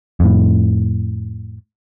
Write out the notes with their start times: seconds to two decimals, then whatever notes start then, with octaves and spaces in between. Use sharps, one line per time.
0.20 F2 A2